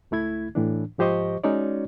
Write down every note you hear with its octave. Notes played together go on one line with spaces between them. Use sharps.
C#2 A3 E4 G#6
A2 E3 D4
G#2 F3 G4 C5 D#5 C#6
G#3 C#4 D#4 F#4 C#5 D5